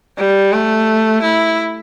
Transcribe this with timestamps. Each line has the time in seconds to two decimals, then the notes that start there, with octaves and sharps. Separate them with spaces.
0.18 G3
0.53 A3
1.22 E4